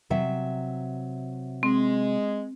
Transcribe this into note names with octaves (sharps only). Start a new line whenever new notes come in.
C3 F#3 E5
G#3 C4